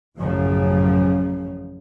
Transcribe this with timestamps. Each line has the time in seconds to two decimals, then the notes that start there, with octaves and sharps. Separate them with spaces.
0.18 A1 F#2 C#3 F3